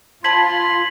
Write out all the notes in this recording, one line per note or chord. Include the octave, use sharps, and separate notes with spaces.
F4 C5 A5 B5 C6 G#6 B6 F#7